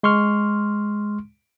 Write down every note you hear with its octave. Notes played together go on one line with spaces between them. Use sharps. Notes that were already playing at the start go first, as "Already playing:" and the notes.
G#3 C6 C#6 F6